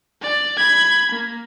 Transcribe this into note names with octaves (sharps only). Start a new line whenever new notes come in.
D5
B5 G#6
A#3